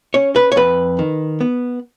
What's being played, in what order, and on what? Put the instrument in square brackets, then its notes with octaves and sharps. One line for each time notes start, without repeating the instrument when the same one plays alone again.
[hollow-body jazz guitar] C#4 C#5
B4
C#5
F2 B4
D#3
B3